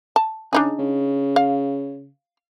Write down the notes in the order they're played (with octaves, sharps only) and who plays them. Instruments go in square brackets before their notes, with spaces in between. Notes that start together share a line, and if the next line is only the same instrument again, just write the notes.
[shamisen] A5
[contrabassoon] C#3 [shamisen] D4 D#4 G#4
[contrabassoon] C#3
[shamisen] F5